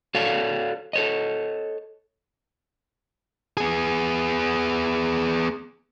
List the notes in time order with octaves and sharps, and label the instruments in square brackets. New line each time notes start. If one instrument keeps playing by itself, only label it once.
[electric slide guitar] F#4 A4 C#5 D5 F5
A4 C#5 D#5
[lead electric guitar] B3 G#4